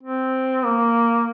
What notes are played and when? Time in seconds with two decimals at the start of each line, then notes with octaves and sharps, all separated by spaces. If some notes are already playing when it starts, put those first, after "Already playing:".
0.03 C4
0.65 A#3